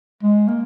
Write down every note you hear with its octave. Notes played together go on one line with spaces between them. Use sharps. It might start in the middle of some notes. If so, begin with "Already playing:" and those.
G#3
A#3